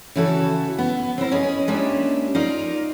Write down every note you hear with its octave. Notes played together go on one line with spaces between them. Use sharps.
C#3 E3 E4 F#4 A4
B3
C4 C#4 E4 A#4
C#4 G#4 D#5
G#3 A#3 C#4 D4 E4 G4
D#4 F4 A#4 D5